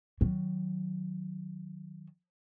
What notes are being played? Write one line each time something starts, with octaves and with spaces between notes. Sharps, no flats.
D#3 F#3